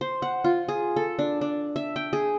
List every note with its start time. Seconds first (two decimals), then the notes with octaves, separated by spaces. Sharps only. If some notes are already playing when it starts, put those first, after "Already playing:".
0.01 C5
0.22 F#5
0.44 F4
0.68 G#4
0.96 A4
1.19 D4
1.41 D4
1.76 E5
1.96 G5
2.13 G#4